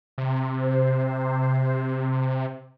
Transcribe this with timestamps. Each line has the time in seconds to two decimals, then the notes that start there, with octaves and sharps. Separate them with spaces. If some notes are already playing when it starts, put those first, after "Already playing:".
0.18 C3
0.59 C5